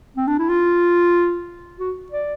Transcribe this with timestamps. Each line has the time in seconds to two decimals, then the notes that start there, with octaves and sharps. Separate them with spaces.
0.17 C4
0.27 D4
0.39 E4
0.49 F4
1.79 F#4
2.12 D5